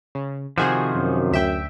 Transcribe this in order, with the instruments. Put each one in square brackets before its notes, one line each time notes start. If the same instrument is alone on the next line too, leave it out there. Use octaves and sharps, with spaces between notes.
[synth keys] C#3
[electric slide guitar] C3 D#3 F3 [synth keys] F#4 G#4 C5
[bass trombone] F#2
[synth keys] D2 E5 G5